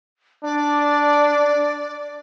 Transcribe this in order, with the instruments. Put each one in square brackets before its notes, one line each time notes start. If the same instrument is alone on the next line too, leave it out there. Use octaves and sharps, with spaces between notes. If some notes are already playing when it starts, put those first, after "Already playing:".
[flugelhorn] D4 [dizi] D5